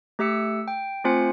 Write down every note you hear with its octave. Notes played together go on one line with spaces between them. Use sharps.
A3 G4 E5 E6 C#7
G5
A3 C4 F4 C5 G#5 C#7